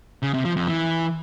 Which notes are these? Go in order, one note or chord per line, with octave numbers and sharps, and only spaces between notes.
C#3
C3
F3
F2
E3